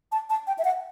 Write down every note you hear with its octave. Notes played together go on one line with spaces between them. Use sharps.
A5
A5
G5
E5
F#5